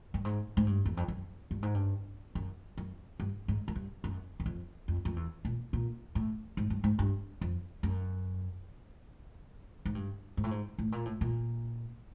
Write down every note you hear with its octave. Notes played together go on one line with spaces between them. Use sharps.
G2
G#2
G#2
G2
E2
F2
F#2
G2
G#2
G2
F#2
F#2
G2
G#2
F#2
G2
F#2
F#2
F2
F2
F2
E2
A#2
A#2
A2
G#2
G2
G#2
G2
F2
F#2
G#2
G2
G#2
A2
G#2
A2
A#2
A2
A#2